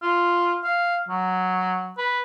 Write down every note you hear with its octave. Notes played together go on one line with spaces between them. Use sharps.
F4
F5
F#3
B4